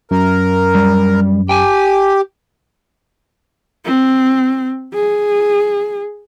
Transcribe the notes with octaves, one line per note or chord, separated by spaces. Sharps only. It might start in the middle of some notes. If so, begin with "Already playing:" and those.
F#2 A#4
G3
G4 G5 G#5
C4
G#4